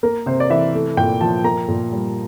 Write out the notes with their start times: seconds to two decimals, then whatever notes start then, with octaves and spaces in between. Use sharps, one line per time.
0.03 A#3 A#4
0.26 C3 C5
0.40 D5
0.50 E3 E5
0.74 A3
0.97 A#2 G5
1.21 F3 A5
1.44 A#3 A#5
1.68 A#2
1.92 G3